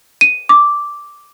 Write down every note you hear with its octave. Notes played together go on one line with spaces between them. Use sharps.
D#7
D6